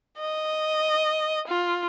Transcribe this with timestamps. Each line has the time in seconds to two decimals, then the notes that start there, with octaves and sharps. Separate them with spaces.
0.18 D#5
1.48 F4